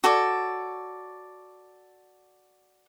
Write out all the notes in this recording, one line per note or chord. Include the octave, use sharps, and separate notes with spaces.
F#4 A4 C#5 D5